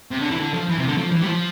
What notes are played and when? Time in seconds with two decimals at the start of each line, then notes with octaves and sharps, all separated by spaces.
0.11 C3
0.21 D3
0.31 E3
0.40 D3
0.54 F3
0.69 E3
0.78 C3
0.88 D3
0.97 F3
1.11 E3
1.21 G3
1.26 F3